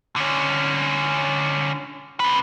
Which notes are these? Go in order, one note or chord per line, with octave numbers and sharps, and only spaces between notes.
D3 C#4
C3 B4